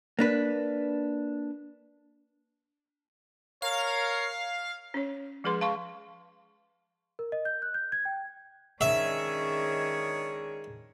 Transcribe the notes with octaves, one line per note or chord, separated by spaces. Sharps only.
A#3 D4 B4
A#4 C#5 F5
C#4 C#5
F3 G#3 G#4 B4 C6
F5 A5 C6 C#6
A#4
D#5
G6
F#6
G6
G#6
G5
D#3 G#3 C#4 D4 G#4 C#5 E5